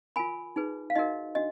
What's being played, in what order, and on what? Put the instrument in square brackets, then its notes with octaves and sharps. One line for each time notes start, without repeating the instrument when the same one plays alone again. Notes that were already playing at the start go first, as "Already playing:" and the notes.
[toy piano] F4 A#4 G#5 B5
D#4 G#4 B4
F5
D#4 F#4 A#4 D#5
D4 F#4 D#5